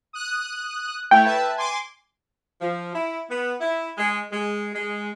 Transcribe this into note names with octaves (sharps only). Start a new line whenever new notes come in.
D#6 F#6
A3 E4 C#5 G5
B4 E5 A5
G#5 C6 D6
F3
E4
B3
E4
G#3
G#3
G#3